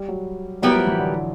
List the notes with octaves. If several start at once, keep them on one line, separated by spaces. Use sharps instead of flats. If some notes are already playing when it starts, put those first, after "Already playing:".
Already playing: G3
F#3
F#3 G3 B3 E4 G4 A#4
F3
E3
D3